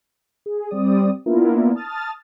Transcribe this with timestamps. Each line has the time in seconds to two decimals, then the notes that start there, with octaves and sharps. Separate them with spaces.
0.46 G#4
0.71 G3 C4 D5 D#6
1.26 A#3 B3 D4 E4 F4 A#4
1.75 A5 D#6 F6 A6